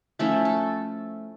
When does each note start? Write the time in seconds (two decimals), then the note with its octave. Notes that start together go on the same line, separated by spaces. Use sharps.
0.19 F3 A3 C#4 E4 A4
0.45 A4